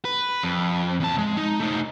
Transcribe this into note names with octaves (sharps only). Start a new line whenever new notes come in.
B4
F2
E2 A5
G#3
D#4
A3 D#4